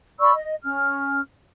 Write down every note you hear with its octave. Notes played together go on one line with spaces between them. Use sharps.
D5 B5 C#6 E6
D#5
C#4 F6